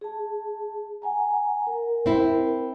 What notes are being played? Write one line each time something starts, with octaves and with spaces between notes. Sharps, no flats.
G#4 A5
F#5 G#5 A#5
A#4
C4 E4